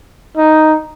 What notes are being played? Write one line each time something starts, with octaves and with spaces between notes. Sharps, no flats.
D#4